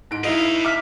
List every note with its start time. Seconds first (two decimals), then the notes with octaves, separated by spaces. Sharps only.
0.11 G#2 D7
0.24 D#4 E4 B4 F5
0.63 E5 D6 F6